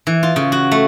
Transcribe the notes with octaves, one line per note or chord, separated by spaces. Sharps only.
E3
F4
C#3
F#4
A3